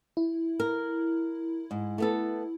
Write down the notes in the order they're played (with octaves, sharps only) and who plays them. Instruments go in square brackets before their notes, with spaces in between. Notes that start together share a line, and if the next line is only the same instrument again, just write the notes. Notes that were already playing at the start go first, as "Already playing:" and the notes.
[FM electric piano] E4
[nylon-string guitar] A#4
G#2
A3 B3 A4